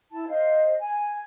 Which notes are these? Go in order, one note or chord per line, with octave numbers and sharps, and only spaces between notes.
E4 A5
C5 D#5 F5
G#5